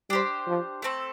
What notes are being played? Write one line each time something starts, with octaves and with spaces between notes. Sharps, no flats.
G3 D4 G4 C5
F3
A3 C4 A4